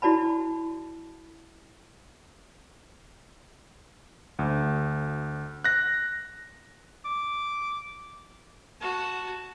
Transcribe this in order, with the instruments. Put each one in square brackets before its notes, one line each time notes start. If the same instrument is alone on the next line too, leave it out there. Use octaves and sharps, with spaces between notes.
[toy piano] E4 F#4 D5 A5 B5
[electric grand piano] D2
F#6 A#6
[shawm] D6
[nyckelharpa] F#4 A5